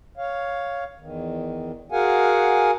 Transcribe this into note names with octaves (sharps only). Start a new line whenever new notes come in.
C#5 F5
E2 D#3
F#4 G#4 A#4 F5 F#5 G#5